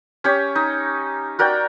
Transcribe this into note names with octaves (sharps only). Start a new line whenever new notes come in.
C#4 G4 C#5
D#4
F#4 A#4 D5 G5